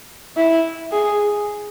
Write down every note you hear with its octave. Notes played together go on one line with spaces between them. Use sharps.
E4
G#4